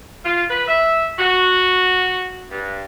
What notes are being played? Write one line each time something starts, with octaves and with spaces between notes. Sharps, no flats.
F4
B4
E5
F#4
G2